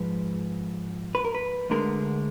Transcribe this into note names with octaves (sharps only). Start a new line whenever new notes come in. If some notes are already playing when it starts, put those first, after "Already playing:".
Already playing: G#2 F3 G#3 B4
B4
A#4
B4
D2 D3 G#3 A#4